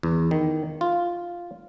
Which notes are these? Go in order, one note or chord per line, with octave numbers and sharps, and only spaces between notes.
E2
D#3
F4